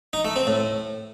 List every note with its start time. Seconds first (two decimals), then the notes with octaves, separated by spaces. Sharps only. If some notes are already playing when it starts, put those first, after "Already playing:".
0.13 D#4
0.25 A3
0.36 C4
0.47 A2